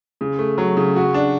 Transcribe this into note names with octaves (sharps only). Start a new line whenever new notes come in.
C#3
A3
F#3
C#3
F#4
D4